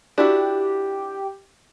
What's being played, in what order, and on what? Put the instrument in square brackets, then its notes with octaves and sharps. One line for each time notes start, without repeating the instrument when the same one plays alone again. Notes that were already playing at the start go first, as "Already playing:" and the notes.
[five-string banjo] D4 E4 F#4 [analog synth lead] G4